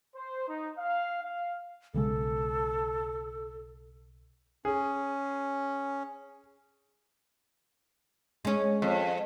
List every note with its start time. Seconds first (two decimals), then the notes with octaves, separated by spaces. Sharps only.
0.15 C5
0.47 D#4
0.77 F5
1.22 F5
1.94 B1 C#3 G#3 A4
4.65 C#4 G#4
8.45 G#3 C#4
8.82 F2